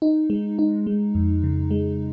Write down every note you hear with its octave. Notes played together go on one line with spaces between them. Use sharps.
D#4
G#3
D#4
G#3
F2
C#3
G#3